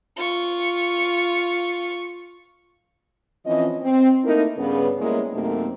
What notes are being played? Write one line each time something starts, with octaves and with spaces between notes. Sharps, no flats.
F4 C#6
E3 F3 C4 C#4 D#5
C4
A3 A#3 D#4 E4 A#4
G2 C#3 B3
G3 G#3 A#3 B3 C#4 E4
F#2 C3 A3 A#3 C4 D#4